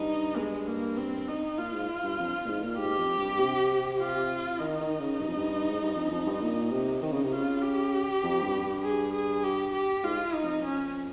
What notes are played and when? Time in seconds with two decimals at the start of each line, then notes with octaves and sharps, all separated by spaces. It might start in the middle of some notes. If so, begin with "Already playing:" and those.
Already playing: G2 D#4
0.37 G#3
0.67 A#3
0.98 C4
1.28 D#4
1.57 A#2 F4
1.74 G#2
2.03 G2
2.19 F2
2.45 A#2
2.49 G#2
2.63 A#2
2.78 G#2 G4
2.98 F2
3.18 G2
3.39 C3
4.00 F4
4.59 D#3 D#4
4.80 D#3
5.00 C#3
5.20 G2
5.28 F2
5.36 G2
5.69 G#2
5.81 G2
5.96 F2
6.11 F2
6.26 G2
6.42 A#2
6.71 C3
7.02 D#3 D#4
7.12 C#3
7.24 C3
7.32 C#3 F4
7.62 G4
8.23 F2
8.43 G2
8.62 G2
8.83 G#4
9.13 G#4
9.43 G4
9.73 G4
10.03 G#2 F4
10.34 D#4
10.43 F2
10.64 C#4